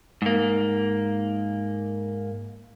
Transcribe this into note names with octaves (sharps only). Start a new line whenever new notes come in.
G#2 A#3